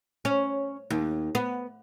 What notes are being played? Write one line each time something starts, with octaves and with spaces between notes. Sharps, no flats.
C#4
D#2
B3